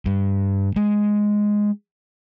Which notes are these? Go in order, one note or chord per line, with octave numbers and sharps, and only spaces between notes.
G2
G#3